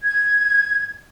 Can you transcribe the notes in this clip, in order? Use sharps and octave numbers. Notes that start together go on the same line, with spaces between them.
G#6